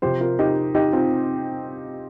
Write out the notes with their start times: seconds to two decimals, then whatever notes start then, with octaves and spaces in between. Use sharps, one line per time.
0.02 C3 F3 G4 C5
0.21 F4 A#4
0.39 D#4 G4
0.75 D#4 G4
0.93 C4 F4